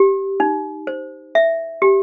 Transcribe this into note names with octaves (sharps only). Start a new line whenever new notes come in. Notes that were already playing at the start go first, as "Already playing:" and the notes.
Already playing: G4
D#4
C5
E5
G4